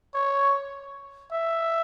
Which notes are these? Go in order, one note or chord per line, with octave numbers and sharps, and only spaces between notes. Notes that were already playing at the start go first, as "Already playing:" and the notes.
C#5
E5